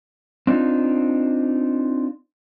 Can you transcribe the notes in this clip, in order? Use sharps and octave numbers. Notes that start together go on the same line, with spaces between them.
C4 D4 D#4 F4